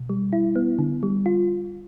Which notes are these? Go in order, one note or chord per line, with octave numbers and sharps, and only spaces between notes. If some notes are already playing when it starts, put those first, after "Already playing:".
Already playing: B2
G3
E4
B3
D3
G3
F4